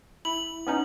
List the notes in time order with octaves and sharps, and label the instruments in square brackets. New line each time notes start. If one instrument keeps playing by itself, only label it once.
[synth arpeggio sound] E4 [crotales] F#7
[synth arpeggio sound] B3 C#4 D#4